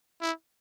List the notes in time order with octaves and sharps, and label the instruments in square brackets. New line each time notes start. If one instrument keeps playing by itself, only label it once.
[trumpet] E4